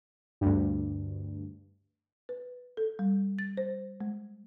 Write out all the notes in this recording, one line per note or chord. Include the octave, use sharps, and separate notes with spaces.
D2 G2
B4
A4
G3
A6
C5
G#3